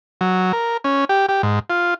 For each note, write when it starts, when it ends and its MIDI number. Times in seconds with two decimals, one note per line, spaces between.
0.21 0.52 54
0.53 0.77 70
0.84 1.05 61
1.09 1.26 67
1.29 1.42 67
1.43 1.59 44
1.70 1.94 65